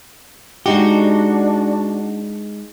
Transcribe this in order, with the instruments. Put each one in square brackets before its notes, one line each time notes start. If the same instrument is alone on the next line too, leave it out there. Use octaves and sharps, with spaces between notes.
[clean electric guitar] G#3 D#4 G4 [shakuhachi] D4 [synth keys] F#4